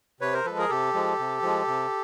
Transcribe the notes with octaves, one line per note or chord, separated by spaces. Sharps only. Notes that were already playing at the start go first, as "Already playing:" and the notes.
C3 B4 C#5
A#4 C5
F3 G#3 A4 B4
G#4 A#4
C3 G4 A4
F3 G#3
C3
F3 G#3
C3